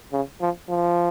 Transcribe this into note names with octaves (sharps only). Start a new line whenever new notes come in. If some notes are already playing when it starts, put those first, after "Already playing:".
C#3
F3
F3